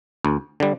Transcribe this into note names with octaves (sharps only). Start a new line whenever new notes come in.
D2
D3 G3